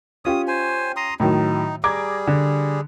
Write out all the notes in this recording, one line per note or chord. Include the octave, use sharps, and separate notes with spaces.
C#4 F4 G4 D#6
C5 G#5
A#5 C6 D#6
A2 D#3 F#3 D#4
G3 G#4 A#5 D6 G#6
D3